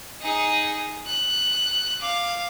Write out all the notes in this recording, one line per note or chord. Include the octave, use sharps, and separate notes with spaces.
D#4 G#4
F#6
F5 D6